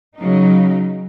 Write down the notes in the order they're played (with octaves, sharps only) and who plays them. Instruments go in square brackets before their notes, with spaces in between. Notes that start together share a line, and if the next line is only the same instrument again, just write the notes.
[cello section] C#3 F#3 D#4